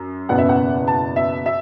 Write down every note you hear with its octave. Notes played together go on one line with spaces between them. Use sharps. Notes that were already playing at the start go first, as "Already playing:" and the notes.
Already playing: F#2
F#1 E2 B2 B3 F#5
E5
F#5
A5
E5
E5